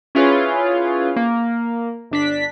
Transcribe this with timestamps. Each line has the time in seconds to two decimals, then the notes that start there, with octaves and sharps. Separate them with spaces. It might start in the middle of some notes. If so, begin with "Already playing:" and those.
0.15 C#4 E4 F4 G#4 B4 C#5
1.16 A#3
2.11 G1 D4 B6